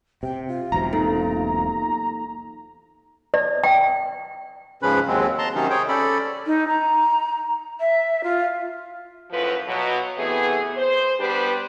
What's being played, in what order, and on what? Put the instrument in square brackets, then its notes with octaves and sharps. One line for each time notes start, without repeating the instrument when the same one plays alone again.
[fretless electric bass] C3 [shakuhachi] G5
[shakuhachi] F4
[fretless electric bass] E1 B1 C3 [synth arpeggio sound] A#5
[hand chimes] A#3 D#4 A4
[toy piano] D5
G5
[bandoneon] G#2 C#3 F3 C#4 B4 B5
D#2 F#3 G#3 C4
A5 A#5 C6
C3 D#3 F#3 C#4 D#4
G#4 C5 C#5 G5
C#4 A4 D5 B5
[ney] D#4
A#5
E5
F4
[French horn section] F#2 A2 F3 F4 B4
B2 F#3
C3 E3 A3 B3 G#4
C5
G3 B3 D4 G4 B4